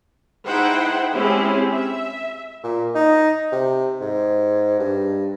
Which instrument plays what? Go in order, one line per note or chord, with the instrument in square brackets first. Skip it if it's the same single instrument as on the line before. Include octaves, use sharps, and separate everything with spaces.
[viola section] D#4 E4 G#4 C5 F#5 G5
G#3 C4 C#4 E4 G4 G#4
E5
[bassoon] A#2
D#4
C3
G#2
G2